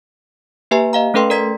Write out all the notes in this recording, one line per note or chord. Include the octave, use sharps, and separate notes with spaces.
A#3 G4 B4 E5 G#5 A#5
D#5 F5 A#5
A3 C#4 A4 B4 G5 C6
A#4 D5 A#5 G#6 B6